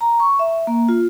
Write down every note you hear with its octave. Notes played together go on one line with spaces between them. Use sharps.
A#5
C#6
E5
A#3
F4